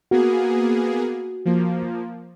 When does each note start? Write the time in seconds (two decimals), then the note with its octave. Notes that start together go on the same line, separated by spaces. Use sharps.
0.11 A#3 B3 F#4 G#4
1.45 F3 A#3